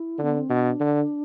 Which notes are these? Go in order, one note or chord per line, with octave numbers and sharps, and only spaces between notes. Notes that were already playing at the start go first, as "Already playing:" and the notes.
Already playing: E4
D3 B3
C4
B2 D4
D3